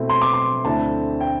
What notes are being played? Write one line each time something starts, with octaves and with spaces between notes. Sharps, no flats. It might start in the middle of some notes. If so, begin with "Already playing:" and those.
Already playing: B2 A3 C4 E4
C6
D6
C6
D2 D3 A3 C4 E4 A5
G5